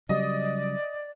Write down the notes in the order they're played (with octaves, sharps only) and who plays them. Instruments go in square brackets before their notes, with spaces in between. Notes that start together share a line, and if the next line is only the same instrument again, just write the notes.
[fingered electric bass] C#3 F#3 G3 [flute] D5 [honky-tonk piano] D#5